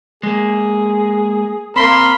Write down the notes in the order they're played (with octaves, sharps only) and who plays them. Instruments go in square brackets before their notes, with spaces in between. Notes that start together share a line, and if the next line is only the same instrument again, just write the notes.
[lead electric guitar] G#3 A#3 [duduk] G#4
[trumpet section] A#3 A#4 C6 [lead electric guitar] C4 [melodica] B5